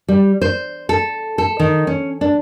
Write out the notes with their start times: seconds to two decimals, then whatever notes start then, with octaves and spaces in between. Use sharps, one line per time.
0.08 G3
0.41 C5
0.89 A4
1.38 A4
1.60 D#3
1.87 C#4
2.21 D4